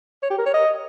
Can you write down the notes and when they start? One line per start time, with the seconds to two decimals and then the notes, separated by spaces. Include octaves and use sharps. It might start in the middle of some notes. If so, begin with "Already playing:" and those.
0.22 C#5
0.30 G4
0.38 A#4
0.46 C#5
0.53 D#5